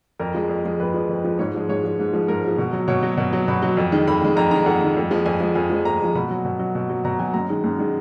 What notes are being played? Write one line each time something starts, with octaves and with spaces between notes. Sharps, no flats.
F2 A#4
F3 G#3
F2
F3 G#3
F2 B4
F3 G#3
F2
F3 G#3
G#2 C#5
F3 G#3
G#2 C#5
F3 G#3
G#2
F3 G#3
G#2 A#4
F3 G#3
B2
F#3
B2 C#5
F#3
B2
F#3
B2 B5
F#3
F2
D#3 G#3
F2 B5
D#3 G#3
F2 A#5
D#3 G#3 A#5
F2 F#5
D#3 G#3
F2
F3 G#3
F2 G#5
F3 G#3
F2 G#5
F3 G#3
F2 A#5
F3 G#3
B2 B5
F#3
B2
F#3
B2
F#3
B2 A#5
F#3 G#5
F#2 A#5
D#3 G#3
F#2
D#3 G#3